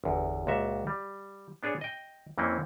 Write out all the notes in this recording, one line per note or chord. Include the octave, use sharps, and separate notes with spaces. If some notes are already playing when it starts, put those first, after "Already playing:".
G1 E2
C#2 A#2 F#4 E5
G3
B3 D4 G#4 C#5
D#5 G5
F2 E3 A#3 C4 C#4